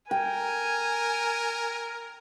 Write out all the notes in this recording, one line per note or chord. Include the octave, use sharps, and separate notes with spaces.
A#4 G5 G#5